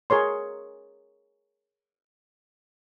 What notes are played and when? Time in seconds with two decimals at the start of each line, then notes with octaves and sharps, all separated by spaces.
0.10 G#4 A#4 C#5 C6